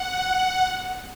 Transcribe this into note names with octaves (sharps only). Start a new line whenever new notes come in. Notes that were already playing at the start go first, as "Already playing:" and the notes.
Already playing: F#5